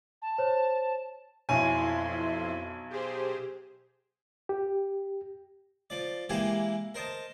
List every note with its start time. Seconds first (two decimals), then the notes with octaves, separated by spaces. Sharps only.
0.22 A5
0.38 C5 C#5
1.49 B1 F2 E4 C#5 G#5 C6
2.90 G4 G#4 C5
4.49 G4
5.90 F3 D5
6.29 E3 G#3 A#3 E4 G4 G#5
6.94 A#4 C5 D#5 A5